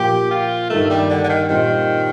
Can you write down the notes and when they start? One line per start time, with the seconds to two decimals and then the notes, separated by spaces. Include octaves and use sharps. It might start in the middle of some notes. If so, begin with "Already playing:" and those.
Already playing: A#2 F3 A#3 G4
0.31 F4
0.70 G2 D#3 A3 A#3 D#4
0.90 G3
1.10 D3
1.24 D3
1.29 D#3
1.49 A#2 D#3 G3 C4